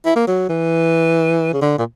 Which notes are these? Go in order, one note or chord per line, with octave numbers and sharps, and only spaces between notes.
E4
A#3
F#3
E3
C#3
D3
A#2